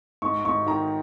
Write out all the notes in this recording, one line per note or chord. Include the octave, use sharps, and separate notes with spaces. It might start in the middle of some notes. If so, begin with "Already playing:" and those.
G#2 C#6
G#2 C#6
D#3 A#5